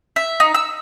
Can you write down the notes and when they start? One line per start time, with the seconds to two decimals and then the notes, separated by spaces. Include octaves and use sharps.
0.16 E5
0.40 D#4
0.54 E6